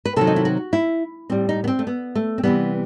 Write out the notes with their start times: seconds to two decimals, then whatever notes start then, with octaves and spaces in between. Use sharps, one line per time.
0.05 B4
0.16 C3 D#3 F#3 A4
0.27 D#4
0.36 E4
0.45 F#4
0.73 E4
1.30 A2 G3 C4
1.49 D#4
1.64 B3
1.68 C4
1.79 A3
1.87 B3
2.15 A3
2.38 C4
2.43 C3 E3 G3 B3